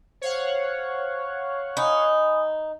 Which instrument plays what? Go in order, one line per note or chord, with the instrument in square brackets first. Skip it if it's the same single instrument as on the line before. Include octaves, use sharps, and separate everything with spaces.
[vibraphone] C5 [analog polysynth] C#5 F5 F#5
[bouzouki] D#4 [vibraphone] G#5 B5 D#6